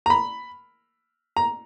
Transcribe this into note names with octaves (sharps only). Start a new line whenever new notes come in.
A#5
B5
A#5